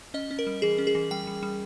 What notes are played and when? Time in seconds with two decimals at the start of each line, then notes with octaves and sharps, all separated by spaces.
0.14 C#4 D#5
0.31 C#4
0.39 A#4
0.47 G3
0.62 E3 G#4
0.78 C#4
0.87 G#4
0.95 E3
1.11 G3 G5
1.27 G3
1.43 G3